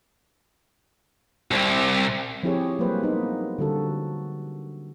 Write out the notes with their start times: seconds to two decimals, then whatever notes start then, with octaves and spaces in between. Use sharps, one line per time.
1.51 C2 C3
2.43 F3 C4 E4 G4 G#4 C#5
2.79 F#3 G3 A#3 B4 C5
3.03 A#3 B3 D#4
3.59 D3 G3 F#4 A4